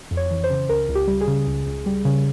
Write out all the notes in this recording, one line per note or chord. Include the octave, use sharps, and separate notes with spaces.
F2
C#5
E3
C5
C#3
C#2 A#4
C#2
G4
G3
G#4
C#3
C#2
C#2
G3
C#3